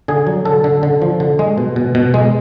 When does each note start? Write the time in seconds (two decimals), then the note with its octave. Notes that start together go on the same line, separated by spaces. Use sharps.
0.08 D3 G#4
0.27 F#3
0.45 D3 A4
0.64 D3
0.83 D3
1.02 F3
1.20 D3
1.39 G#3
1.58 B2
1.76 B2
1.95 B2
2.14 G#3